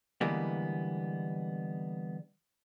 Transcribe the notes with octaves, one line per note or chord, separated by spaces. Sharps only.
D3 E3 G3 G#3 A#3 B3